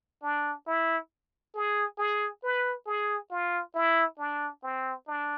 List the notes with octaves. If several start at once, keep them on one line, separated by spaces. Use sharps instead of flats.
D4
E4
G#4
G#4
B4
G#4
F4
E4
D4
C4
D4